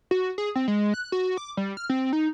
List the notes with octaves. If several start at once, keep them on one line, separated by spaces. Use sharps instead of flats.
F#4
G#4
C4
G#3
F#6
F#4
D6
G3
F6
C4
D#4